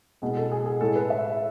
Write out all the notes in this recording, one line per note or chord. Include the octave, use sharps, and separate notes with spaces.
B2 G#3
A4
G#4
G#4
A2 G#3 A4
B4
E5